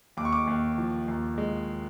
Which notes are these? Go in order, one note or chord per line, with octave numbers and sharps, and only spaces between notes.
D#2 D6
C#6
D6
D#2
F3
D#2
G#3